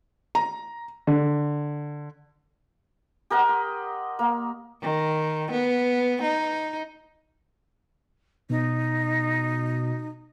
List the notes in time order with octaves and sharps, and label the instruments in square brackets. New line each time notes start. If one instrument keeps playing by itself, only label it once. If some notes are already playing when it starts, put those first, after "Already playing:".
[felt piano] A#5
D3
[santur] G4 A#4 D#5 F#5
C6
A#3
[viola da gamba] D#3
B3
D#4
[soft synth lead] B2 [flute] D#4